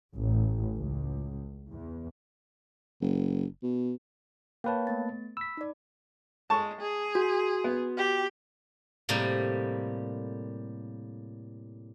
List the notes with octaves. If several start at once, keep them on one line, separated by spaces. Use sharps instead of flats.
A1
C#2
E2
F#1
B2
A#3 B4 C#5 F5 G5 A5
A3 B3 A6
B5 E6 B6
D#4 D5
G#3 A5 C#6
G#4
F#4
B3
G4
A2 C3 G3 A#3